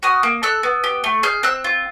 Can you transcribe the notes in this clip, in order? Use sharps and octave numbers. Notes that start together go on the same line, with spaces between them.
F#4 D#6 F6
A#3
A4 E6 F#6
B3
G4
A3
G#4 F6 G6
C4 E6 F#6
F4